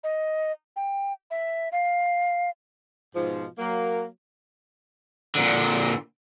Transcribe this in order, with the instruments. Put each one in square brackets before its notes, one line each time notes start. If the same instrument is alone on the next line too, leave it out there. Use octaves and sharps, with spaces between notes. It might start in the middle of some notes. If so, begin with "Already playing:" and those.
[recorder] D#5
G5
E5
F5
[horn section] G#2 B2 F3
F#3 A#3
[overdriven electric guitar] A#2 D3